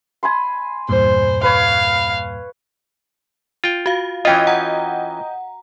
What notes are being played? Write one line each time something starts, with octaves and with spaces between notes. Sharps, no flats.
G#5 B5 C6
E2 G2 A#2 C5
B4 C#5 F5
F4 G5
F#4 F5
E3 C#4 F4 D#5 G5
F#5 A#5